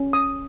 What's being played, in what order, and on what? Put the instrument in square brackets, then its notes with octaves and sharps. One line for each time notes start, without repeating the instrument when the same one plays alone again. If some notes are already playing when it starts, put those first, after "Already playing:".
Already playing: [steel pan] C#4
D#6